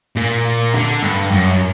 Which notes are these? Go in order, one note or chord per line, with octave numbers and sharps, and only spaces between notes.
A#2
D3
G2
F#2